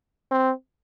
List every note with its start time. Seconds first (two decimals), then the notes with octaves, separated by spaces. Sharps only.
0.31 C4